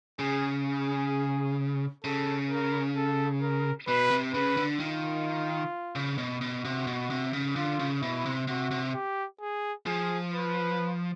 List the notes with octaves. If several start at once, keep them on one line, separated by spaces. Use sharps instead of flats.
C#3 G#4
G#4
C#3 A4
A#4
A4
A#4
B2 B4
C3
C#3 B4
D3
D#3 F4
C#3
B2
B2
C3 F#4
B2
C3
C#3
D3 F4
C#3
B2 E4
C3
C3 F#4
C3
G4
G#4
F3 G#4
B4